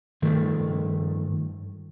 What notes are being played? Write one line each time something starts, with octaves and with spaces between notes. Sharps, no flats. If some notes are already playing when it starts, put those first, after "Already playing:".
G2 D#3 F3 A3